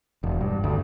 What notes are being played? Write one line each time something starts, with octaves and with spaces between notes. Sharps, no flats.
E1
G2
D2